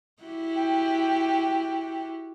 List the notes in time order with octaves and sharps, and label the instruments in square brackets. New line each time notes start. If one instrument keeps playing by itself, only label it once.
[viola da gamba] E4 F#4 G4
[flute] G5